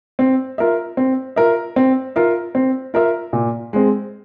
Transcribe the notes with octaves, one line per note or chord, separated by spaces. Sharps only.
C4
F4 A#4 E5
C4
F4 A#4 E5
C4
F4 A#4 E5
C4
F4 A#4 E5
A#2
G#3 C4